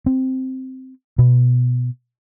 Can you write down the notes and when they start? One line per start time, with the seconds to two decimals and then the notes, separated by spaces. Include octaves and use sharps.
0.06 C4
1.18 B2